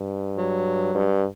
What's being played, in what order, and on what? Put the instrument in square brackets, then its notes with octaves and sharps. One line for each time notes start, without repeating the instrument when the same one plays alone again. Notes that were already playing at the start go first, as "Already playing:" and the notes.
Already playing: [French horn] G2
[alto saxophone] F#3
[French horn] G2